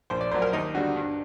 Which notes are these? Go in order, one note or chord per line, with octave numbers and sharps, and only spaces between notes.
A#1 C5
D5
A#2 F#3 C5
A#4
D#2 D#4
D3 G3 F#4
G2